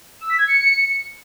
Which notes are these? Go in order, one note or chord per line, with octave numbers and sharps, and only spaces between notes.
E6
B6
G#6
C#7